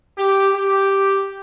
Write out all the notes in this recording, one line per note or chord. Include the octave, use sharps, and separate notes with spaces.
G4
G4